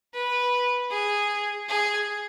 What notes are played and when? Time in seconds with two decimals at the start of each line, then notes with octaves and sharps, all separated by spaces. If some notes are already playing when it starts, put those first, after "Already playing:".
0.14 B4
0.91 G#4
1.68 G#4